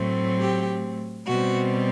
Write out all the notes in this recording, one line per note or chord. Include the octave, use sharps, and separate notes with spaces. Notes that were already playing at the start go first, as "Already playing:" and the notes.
Already playing: A2 F#3 A3 C4
G4
B2 G3 C4 F#4